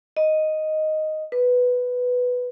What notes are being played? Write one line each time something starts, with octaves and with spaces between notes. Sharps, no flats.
D#5
B4